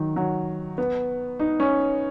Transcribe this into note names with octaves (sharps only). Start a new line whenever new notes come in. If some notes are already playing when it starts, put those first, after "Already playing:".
Already playing: D#3 F#3
F#3
B3
D#4
C#4